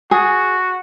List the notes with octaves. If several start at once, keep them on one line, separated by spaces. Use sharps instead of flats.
F#4 G#4